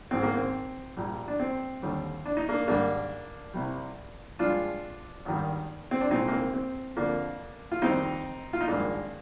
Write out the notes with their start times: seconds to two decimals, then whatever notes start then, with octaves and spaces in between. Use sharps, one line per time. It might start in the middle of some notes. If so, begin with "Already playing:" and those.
0.11 G#1 G#2 D#3 C4
0.23 A#3
0.36 C4
0.97 A#1 A#2 G3
1.28 D4
1.40 C4
1.82 D#2 D3 G3
2.26 D4
2.37 D#4
2.49 A#3 D4
2.68 G#1 G#2 G3 A#3 D4
3.54 C2 C3 G3
4.39 G2 F3 G#3 D4 F4
5.25 G#1 G2 D#3 G3
5.91 C4
6.01 D4
6.11 C2 A#2 G#3 C4 D#4
6.28 A#3
6.32 C4
6.53 C4
6.96 F2 D3 F3 A#3 D4
7.72 F4
7.82 F2 D#3 G3 C4 D#4
8.53 F4
8.61 D#4
8.68 G#1 G2 F3 G#3 A#3 D4